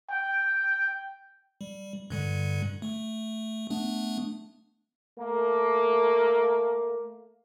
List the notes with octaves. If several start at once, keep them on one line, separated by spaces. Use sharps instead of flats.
G5
G3
G2 D3 G3
A3
A3 B3 D4
A3 A#3